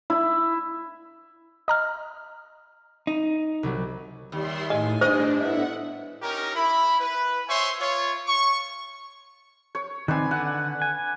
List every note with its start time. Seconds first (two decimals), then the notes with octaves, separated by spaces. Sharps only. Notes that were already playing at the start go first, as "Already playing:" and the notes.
0.10 E4
1.68 D#5 A#5 F6
3.07 D#4
3.63 C2 F#3 G3
4.32 D#2 G3 E5 C6
4.70 A2 D#5 G#5
5.01 G2 D4 C5 D#5
5.40 A2 B3 E5 F#5
6.22 C#4 D#4 G4 A#4
6.55 E4 B5
7.00 B4
7.48 C5 C#5 E5 G#5 C6 C#6
7.80 F4 C#5
8.28 C#6
9.75 C#5
10.08 D#3 C4 B4 D5 G#5
10.31 D3 F#5
10.82 G#5